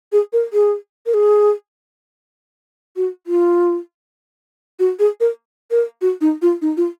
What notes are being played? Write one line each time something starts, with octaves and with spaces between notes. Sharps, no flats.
G#4
A#4
G#4
A#4
G#4
F#4
F4
F#4
G#4
A#4
A#4
F#4
D#4
F4
D#4
F4